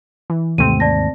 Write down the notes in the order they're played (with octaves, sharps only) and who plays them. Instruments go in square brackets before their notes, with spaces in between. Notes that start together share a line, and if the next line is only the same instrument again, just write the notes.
[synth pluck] E3
[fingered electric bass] D#2 G#2 [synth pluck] C3 A3 C4 [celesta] D#7
[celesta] D5 A5 A#6